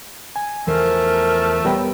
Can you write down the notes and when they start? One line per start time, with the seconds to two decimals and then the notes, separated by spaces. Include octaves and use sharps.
0.36 G#5
0.67 E2 F3 A3 A#4 C5
1.65 G3 B3 A#4 C#5 G5